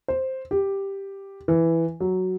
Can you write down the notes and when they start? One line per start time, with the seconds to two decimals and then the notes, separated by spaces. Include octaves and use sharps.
0.08 C5
0.51 G4
1.48 E3
2.00 F#3